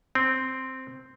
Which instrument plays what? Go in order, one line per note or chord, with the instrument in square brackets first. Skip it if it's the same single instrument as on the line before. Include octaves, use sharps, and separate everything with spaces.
[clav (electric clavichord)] C4